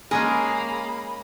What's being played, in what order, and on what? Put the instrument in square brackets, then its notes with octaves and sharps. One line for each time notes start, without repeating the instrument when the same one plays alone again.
[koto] G#3 C#4 A#4 [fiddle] A#3 [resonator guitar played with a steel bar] G#4 [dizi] B5